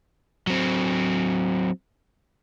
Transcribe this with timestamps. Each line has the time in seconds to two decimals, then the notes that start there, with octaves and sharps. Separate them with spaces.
0.47 F#3 C4